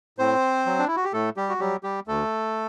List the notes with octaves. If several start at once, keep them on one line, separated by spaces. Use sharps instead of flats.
A2 C4 C5
F#3
D4
E4
F#4
G4
A2 A3 A4
G3 G4
F#4
F#3 G3 G4
G3 G4
D2 A3 A4